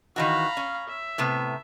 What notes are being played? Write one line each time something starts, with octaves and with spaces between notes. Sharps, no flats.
D#3 E3 F#4 F5 A#5 B5
C#4
E5
A2 C3 B3